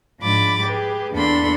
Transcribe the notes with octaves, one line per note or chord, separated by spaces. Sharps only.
G#2 F3 D4 B5 D6 A6
G4 G#4 B4
E2 A#3 D4 A4 B5 C6